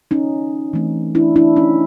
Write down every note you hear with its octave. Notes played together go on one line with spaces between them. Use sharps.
C#4 D#4
E3 A3 C4
D4 E4
D4 E4
C#4 D#4